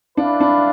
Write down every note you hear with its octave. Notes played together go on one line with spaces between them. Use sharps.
D4 E4 B4 D5 F5
D4